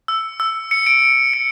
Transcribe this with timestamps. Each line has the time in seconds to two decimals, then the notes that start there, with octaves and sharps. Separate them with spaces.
0.08 E6
0.40 E6
0.71 C#7
0.87 D7
1.33 C#7